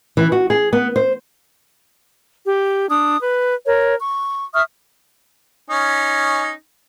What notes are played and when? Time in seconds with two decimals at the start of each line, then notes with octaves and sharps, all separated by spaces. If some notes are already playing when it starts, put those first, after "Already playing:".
0.17 E3
0.32 F#4
0.50 G#4
0.73 B3
0.96 C5
2.46 G4
2.89 D4 D#6
3.21 B4
3.66 A#4 C#5
4.00 C#6
4.54 E5 C#6 D#6 F6
5.70 C#4 D#4